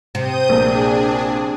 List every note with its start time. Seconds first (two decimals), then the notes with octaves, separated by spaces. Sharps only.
0.15 C3 D#6 G6 D#7
0.49 A#1 A#3 D4 G#4